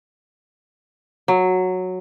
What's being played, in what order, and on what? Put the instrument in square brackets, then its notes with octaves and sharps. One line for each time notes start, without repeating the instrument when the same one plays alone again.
[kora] F#3